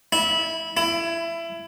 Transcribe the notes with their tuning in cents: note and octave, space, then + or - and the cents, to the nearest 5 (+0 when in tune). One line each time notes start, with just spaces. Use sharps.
E4 -20
E4 +20